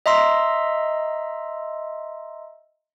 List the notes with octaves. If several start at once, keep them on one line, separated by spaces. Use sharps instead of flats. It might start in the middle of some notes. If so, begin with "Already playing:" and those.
D#5 E5 A#5 C6 E6